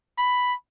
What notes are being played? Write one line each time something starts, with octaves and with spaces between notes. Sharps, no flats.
B5